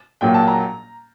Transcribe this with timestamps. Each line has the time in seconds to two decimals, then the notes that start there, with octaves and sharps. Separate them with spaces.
0.21 A#1 A#2 F#3 A#3 G5
0.34 A5
0.47 A#5